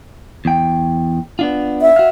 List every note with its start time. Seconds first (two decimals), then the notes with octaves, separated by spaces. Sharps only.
0.45 E2 G5
1.39 B3 D4 F4
1.82 E5
1.96 F#4 F5